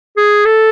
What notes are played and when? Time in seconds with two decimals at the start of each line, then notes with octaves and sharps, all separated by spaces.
0.17 G#4
0.45 A4